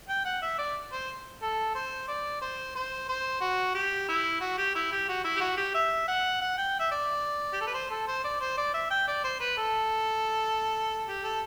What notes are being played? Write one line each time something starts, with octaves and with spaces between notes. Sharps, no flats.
G5
F#5
E5
D5
C5
A4
C5
D5
C5
C5
C5
F#4
G4
E4
F#4
G4
E4
G4
F#4
E4
G4
F#4
G4
E5
F#5
F#5
G5
E5
D5
G4
A4
B4
C5
A4
C5
D5
C5
D5
E5
G5
D5
C5
B4
A4
G4
A4